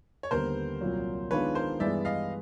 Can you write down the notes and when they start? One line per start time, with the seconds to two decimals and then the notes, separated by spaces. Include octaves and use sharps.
0.23 C#5
0.31 D#2 D3 G3 B3 A#4 C5
0.81 C2 A#2 F#3
1.31 D#3 G#3 B3 D4 F4 B4 C#5
1.55 A#4 C5
1.80 G2 E3 G#3 B3 D5 E5
2.05 D#5 F5